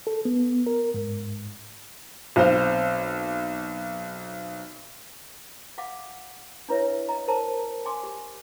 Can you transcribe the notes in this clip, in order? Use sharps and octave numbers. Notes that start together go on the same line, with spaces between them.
A4
B3
A#4
G#2
B1 C4 C5 F5
F5 F#5 D6
D4 E4 B4 C#5 E5
D#5 A#5
A#4 C5 A5 A#5
G#5 C6 D6
G4